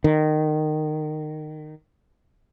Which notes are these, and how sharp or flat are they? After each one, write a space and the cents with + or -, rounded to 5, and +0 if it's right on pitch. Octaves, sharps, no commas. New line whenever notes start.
D#3 -20